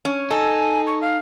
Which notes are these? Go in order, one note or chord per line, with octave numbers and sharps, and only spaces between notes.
C#4
D#4 A4 G#5
C#6
F5